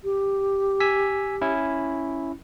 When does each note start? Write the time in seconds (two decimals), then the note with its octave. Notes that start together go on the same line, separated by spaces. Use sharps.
0.04 G4
0.80 G#5 E6 B6
1.41 C#4 E4